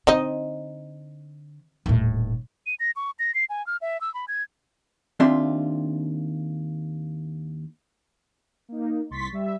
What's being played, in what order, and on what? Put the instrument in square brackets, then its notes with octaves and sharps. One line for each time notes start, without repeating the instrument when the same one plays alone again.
[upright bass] D3 [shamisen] C4 D#4 D#5
[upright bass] D#1 A2
[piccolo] D#7
A#6
C#6
A#6
C7
G#5
F6
E5
E6
B5
G#6
[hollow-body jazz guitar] D#2 C4 D4 F4 E5 C6
[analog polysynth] A#3 D#4
C2 C6 C#6 A6 B6
G3 E5